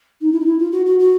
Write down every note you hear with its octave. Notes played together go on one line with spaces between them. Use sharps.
D#4
E4
D#4
E4
F4
F#4
F#4
F#4